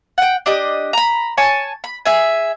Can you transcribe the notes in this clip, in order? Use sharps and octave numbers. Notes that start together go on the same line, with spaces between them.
F#5 G5
D4 G4 D#5
A#5 B5
C#5 G#5 A5
B5
G#4 E5 G#5